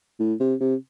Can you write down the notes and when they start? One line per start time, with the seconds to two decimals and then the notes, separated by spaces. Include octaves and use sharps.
0.20 A2
0.40 C3
0.60 C3